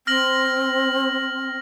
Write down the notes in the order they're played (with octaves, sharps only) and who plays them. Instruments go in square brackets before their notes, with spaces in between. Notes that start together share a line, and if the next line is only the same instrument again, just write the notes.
[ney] C4 [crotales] F6 A#6 F#7